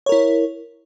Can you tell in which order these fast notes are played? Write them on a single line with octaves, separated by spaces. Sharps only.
C#5 A#4 E4